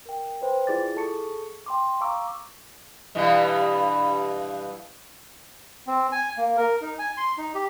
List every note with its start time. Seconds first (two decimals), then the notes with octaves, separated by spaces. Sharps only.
0.06 A#4 G5
0.42 B4 C5 G5
0.67 E4 F4 G#4 D5 D6 A6
0.96 G#4 A4 A5 C#6 C#7
1.66 G5 C6 D6
2.01 F5 A#5 C#6 D6 E6
3.15 G2 B2 E3
5.87 C4
6.12 G#5
6.37 A#3
6.57 A#4
6.81 D#4
6.99 G#5
7.17 C6
7.38 D#4
7.55 G4